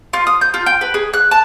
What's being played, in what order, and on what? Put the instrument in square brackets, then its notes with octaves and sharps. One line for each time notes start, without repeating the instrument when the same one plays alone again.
[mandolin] F4
D#6
G6
F4
G5
B4
G#4
F#6
A5